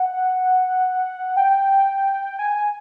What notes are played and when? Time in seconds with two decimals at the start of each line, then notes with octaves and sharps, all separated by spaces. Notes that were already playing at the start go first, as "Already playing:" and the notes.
Already playing: F#5
1.37 G5
2.39 G#5
2.56 G#5